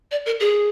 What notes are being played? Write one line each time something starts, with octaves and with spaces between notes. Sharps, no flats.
D5
A#4
G#4